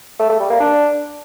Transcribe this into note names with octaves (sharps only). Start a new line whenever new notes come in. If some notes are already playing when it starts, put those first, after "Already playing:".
A3
A3
G3
A#3
D4